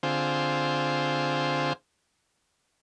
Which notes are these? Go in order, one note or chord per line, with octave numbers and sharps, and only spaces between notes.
D3 C4 F4 G#4 C5